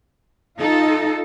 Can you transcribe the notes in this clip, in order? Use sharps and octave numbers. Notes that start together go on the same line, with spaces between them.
D#4 F4 A4